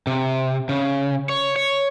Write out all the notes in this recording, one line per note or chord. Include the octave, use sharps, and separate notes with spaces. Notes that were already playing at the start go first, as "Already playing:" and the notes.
C3
C#3
C#5
C#5